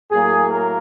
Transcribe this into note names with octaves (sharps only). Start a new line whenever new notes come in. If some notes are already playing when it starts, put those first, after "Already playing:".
A2 F#3 A#3 G#4
A#4